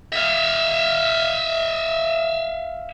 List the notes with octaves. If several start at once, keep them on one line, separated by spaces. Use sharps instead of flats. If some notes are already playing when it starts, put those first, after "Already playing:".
E5 F5